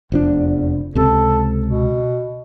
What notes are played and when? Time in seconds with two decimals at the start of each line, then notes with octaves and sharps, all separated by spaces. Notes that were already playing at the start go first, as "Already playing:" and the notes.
0.12 F1 E2 F3 D4
0.95 C#2 C3 A4
1.66 B2